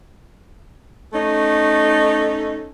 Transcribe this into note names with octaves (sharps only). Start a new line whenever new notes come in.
A3 C#4 D#4